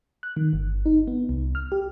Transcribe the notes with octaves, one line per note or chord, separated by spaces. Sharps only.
F#6
D#3
G1
D#4
B3
C2
F6
G4